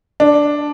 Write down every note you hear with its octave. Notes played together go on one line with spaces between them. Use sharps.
D4